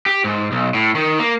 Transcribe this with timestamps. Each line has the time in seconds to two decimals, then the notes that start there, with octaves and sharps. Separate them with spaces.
0.06 G4
0.24 G#2
0.52 B1
0.74 A2
0.95 D#3
1.19 A#3